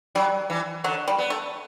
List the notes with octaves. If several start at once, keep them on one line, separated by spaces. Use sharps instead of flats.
F#3 G3
E3
D3 F#3
G3
B3
A3